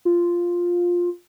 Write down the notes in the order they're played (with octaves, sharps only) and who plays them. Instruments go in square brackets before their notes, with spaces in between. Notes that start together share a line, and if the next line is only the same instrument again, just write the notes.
[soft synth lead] F4